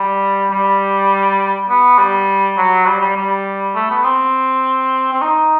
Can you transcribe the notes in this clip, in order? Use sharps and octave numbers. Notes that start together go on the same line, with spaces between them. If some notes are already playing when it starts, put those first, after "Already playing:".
Already playing: G3
G3
B3
G3
F#3
G3
G3
G3
A3
B3
C4
C4
D#4